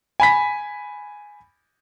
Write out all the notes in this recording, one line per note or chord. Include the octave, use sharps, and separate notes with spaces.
G#5 B5 B6